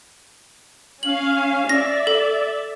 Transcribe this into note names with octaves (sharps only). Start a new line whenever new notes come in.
C#4 F5 F#7
D5 E5 A#6
A4